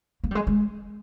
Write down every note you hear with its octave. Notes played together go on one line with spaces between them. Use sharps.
A#3
G3
G#3
G#3